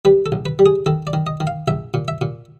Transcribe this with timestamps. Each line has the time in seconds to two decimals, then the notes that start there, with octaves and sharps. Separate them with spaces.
0.05 G3 B4
0.26 A4
0.32 A#1
0.46 B4
0.59 G3
0.66 G#4
0.86 D#3 A4
1.07 D5
1.13 D#3
1.27 D#5
1.40 D#3
1.47 F5
1.68 A#1 E5
1.94 A#2
2.08 E5
2.21 A#2